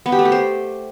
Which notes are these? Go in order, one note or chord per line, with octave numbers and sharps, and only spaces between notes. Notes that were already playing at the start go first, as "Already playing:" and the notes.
B3
G4
A3
G4
C5